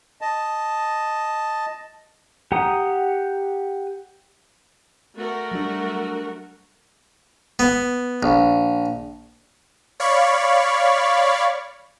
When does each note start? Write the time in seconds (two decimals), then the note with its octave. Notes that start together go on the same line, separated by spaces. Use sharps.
0.21 D#5 A5
2.52 G4 F#5 A#5 D#6
5.16 A3 F#4 A#4
5.52 F#3 G3 D4
7.59 B3
8.23 A#1
10.00 C#5 D5 F5 B5 C#6